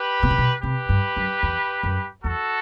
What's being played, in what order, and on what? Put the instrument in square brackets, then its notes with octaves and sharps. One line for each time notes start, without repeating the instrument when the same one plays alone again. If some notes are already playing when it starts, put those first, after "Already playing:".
Already playing: [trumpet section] G4 B4
[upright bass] B2
C3
B2
[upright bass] C3 [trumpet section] G4 B4
[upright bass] G2
F#2
E2
F#2
[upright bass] E2 [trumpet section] F#4 A4